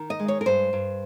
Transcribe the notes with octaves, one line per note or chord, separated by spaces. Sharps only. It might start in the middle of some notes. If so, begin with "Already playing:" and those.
Already playing: D#3
D#5
G#3
C#5
A#4
G2 C5
G2